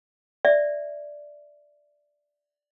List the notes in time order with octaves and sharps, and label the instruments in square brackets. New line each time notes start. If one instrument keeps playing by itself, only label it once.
[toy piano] D5 E5